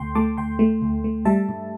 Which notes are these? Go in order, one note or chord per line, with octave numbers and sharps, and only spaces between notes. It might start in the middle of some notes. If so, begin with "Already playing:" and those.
Already playing: D2 A3 G5 C6
A3 A5 D6
D2 G5 C6
A3
D2
A3
G3 E5 A5
G2